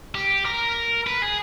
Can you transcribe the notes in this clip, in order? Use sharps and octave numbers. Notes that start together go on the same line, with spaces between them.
G4
A#4
B4
G#4